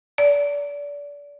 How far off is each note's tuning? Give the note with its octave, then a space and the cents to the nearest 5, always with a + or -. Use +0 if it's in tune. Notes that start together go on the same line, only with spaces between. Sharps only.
D5 -30